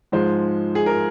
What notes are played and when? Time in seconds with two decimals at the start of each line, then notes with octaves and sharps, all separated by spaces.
0.12 G#2 F3 G#3 C5
0.75 G#4
0.86 A#4